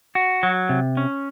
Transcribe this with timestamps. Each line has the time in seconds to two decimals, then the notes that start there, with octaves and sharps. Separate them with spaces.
0.15 F#4
0.43 F#3
0.69 C3
0.97 C#4